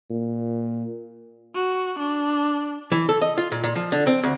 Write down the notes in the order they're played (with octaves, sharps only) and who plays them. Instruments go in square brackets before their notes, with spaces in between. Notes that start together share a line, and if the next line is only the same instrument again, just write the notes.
[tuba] A#2
[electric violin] F#4
D4
[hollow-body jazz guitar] E3
A4
D#5
F4
A#2
A#2
F3
D3
C4
D2